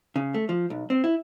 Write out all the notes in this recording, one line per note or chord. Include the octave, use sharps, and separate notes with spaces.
C#3
A3
F3
B1
C4
E4